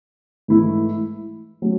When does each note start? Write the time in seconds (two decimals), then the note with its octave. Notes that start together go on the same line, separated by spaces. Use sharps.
0.48 G#2 E3 A3 E4
1.62 F#3 A3 C#4